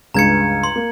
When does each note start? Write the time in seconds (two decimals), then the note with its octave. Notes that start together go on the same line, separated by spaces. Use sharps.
0.14 C#2 G2 G#3 A#5 G#6 C#7
0.64 C6
0.76 A#3